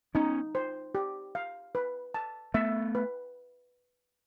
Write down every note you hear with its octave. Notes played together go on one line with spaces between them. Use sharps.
B3 C#4 D#4
C5
G4
F5
B4
A5
A3 B3 E5
B4